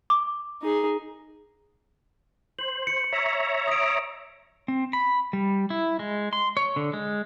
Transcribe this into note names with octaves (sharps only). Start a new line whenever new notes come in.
D6
D#4 G#4
C5 F#7
C#7
C#5 E5 A#5 B6
D#6 D7
C4
B5
G3
E4
G#3
C6
C#5
D3
G#3